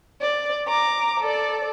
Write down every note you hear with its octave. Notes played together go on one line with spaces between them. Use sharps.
D5
A#5 D6
A4 D5